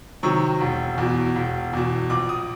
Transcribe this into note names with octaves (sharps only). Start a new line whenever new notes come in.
C3 D#3 F#3 C#6
E1
E2 B2
E1
E2 B2
A#1 D6
D#6